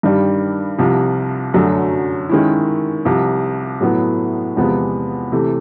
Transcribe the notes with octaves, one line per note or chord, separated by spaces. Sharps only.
G2 D#3 G3
C2 C3 F3
F#2 D3 F#3 A3
D#3 G#3 C#4 E4
C2 C3 F3
A2 F#3 B3 E4
E2 C3 F3 G#3 B3
C3 E3 A3